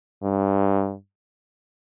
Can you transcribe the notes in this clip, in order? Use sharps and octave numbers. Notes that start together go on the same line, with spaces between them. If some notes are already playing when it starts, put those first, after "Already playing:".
G2